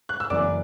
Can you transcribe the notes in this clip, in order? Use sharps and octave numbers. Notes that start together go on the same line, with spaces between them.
F#6
E6
F#1 F#2 E3 D5 D6